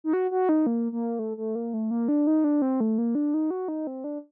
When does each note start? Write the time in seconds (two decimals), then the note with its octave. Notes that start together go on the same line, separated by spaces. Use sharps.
0.04 D#4
0.13 F#4
0.31 F#4
0.49 D#4
0.67 A#3
0.92 A#3
1.19 A3
1.37 A3
1.55 A#3
1.74 A3
1.91 A#3
2.08 D4
2.27 D#4
2.44 D4
2.62 C4
2.80 A3
2.98 A#3
3.15 D4
3.34 D#4
3.50 F#4
3.68 D#4
3.87 C4
4.04 D4